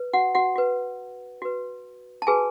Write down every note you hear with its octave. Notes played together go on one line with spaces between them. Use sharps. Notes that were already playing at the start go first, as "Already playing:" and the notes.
Already playing: B4
F#4 F#5
F#4 F#5
F#4 B4
F#4 B4
A5
F#4 G#4 B4 G#5